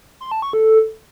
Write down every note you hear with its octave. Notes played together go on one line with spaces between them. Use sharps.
C6
A5
C#6
A4